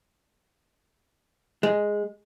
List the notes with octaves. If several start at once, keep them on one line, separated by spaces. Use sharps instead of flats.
G#3